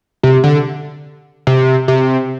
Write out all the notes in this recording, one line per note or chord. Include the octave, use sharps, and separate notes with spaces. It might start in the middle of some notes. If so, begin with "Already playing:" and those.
C3
D3
C3
C3